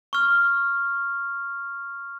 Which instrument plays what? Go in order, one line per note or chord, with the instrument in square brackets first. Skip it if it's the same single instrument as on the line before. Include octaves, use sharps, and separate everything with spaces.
[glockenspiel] C#6 F6